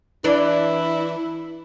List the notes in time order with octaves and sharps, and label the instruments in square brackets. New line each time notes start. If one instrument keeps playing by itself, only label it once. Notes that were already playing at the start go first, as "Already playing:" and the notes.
[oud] E3 D4 [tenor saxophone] E4